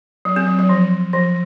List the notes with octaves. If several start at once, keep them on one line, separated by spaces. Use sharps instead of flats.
F#3
C4
F#3
F#3
F3
F3